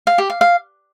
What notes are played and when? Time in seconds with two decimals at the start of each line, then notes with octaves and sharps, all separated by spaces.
0.07 F5
0.18 G4
0.30 F5
0.41 F5